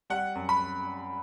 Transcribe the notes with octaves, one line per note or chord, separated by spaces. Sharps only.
G3 F#5
F#2
B5